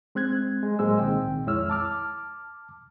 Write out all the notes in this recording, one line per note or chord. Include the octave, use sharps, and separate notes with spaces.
G#3 C4 F#6 G#6
G#3
A2 F#3 G#3 A#3 C5 E6
C2 A#2 D#3 C4 G5
F2 G#3 E4 C#5 E6 F6
A5 D6 F6